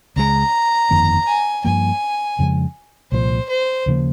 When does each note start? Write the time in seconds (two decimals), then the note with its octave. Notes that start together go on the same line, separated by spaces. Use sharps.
0.16 C#2 C#3 F3 G#3 A#5
0.91 G1 F2 D#3 A#3
1.27 G#5
1.65 G2 F3 A#3 G#5
2.39 F2 C#3 F3 G#3
3.12 C2 A#2 F3 C5
3.49 C5
3.86 D#2 C#3 F3 A#3